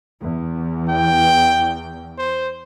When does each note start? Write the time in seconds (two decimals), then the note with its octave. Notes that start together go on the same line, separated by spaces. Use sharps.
0.21 E2
0.89 G5
2.18 C5